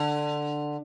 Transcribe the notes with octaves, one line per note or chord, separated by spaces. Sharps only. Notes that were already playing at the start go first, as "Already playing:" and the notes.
Already playing: D3